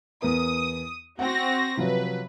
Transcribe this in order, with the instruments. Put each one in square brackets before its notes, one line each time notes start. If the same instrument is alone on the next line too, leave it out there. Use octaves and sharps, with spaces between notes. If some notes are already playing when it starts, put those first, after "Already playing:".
[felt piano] E2 B3 A#4 [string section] D#6
[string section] C4 F#4 A#6 [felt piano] F#5 G5
[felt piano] C3 F3 F#3 [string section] B4